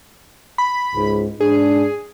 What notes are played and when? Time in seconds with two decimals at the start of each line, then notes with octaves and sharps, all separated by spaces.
0.58 B5
0.94 C#2 G#2
1.41 G#2 D4 G#4